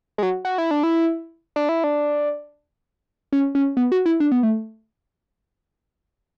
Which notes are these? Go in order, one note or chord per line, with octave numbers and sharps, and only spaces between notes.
G#3
F#3
F#4
E4
D4
E4
D4
E4
D4
C#4
C#4
B3
F#4
E4
D4
B3
A3